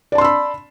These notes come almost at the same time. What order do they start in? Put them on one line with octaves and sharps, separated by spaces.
D5 A5 C6 E6 B5